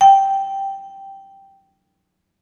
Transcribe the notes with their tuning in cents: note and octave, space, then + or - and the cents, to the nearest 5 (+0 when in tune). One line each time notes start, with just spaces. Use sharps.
G5 -5